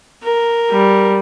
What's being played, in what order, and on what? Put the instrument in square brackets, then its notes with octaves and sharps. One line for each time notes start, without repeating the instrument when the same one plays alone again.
[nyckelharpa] A#4
[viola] G3